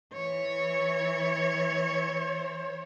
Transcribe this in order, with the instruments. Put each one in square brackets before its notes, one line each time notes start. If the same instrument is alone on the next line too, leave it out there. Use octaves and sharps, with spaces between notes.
[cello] E3 C#5